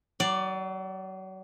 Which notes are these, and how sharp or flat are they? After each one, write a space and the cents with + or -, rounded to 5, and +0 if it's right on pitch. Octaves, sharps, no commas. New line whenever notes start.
F#3 +35 D5 +0